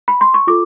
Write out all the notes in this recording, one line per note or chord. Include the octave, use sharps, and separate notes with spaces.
B5
C6
C#6
F4 A4 D6